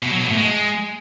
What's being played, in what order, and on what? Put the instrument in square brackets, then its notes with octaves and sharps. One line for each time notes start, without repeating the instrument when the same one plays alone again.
[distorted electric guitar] B2
F#3
B2
A2
G#3